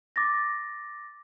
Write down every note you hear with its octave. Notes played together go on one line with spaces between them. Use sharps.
D6 A6 A#6